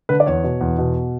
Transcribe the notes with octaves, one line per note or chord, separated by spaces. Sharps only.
D3 B4
D5
E2 C#5
B2
E2
B2